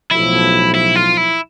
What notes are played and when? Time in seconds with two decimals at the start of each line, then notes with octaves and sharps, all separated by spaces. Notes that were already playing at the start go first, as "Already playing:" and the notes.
0.11 B1 A2 F3 E4
0.75 E4
0.95 F4
1.17 E4